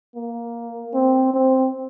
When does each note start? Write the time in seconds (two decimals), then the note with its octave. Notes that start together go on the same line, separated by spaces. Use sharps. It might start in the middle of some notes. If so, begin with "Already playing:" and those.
0.15 A#3
0.94 C4
1.33 C4